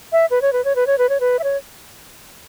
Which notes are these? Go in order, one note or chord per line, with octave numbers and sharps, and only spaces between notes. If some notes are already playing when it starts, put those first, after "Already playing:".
E5
B4
C#5
B4
C#5
B4
C#5
B4
C#5
B4
E5
C#5